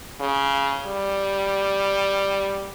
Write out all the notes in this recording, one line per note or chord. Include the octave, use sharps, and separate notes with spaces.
C#3
G3